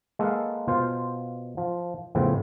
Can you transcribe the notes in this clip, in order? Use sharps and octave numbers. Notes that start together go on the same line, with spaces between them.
G#3 A#3 A4 B4 F5 F#5
B2 F4 C5
F3
F2 A2 C#3 B3 C4